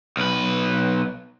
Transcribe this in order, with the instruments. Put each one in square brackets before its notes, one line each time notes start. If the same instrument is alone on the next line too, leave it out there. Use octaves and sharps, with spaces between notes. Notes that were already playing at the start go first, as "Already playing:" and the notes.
[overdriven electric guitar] B1 B4